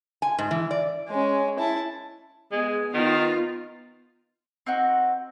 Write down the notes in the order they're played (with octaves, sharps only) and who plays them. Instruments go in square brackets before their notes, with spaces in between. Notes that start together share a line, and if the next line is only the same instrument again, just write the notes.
[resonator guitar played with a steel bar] G#5
G#2
E3
D5
[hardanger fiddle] G#3 C#4
E4 A5
[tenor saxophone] G#3 [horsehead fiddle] B3
[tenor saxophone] D#3 [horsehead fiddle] B3 D#4 [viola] F4
[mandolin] C4 D#4 F#4